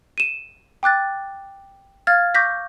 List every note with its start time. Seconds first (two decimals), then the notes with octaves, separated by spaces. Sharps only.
0.18 D#7 E7
0.83 G5 D6 F#6 A6
2.07 F5 F6 G#6 A6
2.35 C#6 D6 G6 A#6 B6